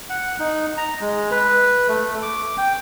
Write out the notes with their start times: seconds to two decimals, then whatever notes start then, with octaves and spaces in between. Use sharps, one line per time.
0.10 F#5
0.40 D#4
0.77 A#5
1.01 G#3
1.31 B4
1.88 A3
2.22 D6
2.58 G5